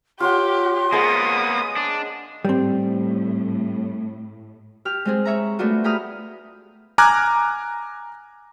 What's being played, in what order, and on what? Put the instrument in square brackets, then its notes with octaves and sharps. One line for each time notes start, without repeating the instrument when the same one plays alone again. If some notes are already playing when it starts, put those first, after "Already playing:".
[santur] F4 C#5 F#5 [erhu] G4 [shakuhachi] C6
[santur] G#3 C5 F#5 [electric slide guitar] A#3 B3 [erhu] D#6
[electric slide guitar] D4
[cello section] A2 [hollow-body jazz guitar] G3 C4
[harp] G4 F6
G#3 C4 G#4
C#5 E5 A#5
A3 B3 D4 F4 F#4
G4 G#4 A#5 B5 D#6 F6
[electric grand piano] G#5 A#5 D6 F6 F#6 G#6